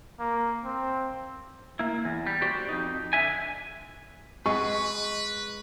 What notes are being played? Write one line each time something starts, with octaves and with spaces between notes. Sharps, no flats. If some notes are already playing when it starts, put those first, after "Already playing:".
A#3
C4
A#3 E4
E2
G3
F#4 G4 C5 D5
F2 D#4
D3 E5 G#5
G#3 B4 D#5 F#5 C#6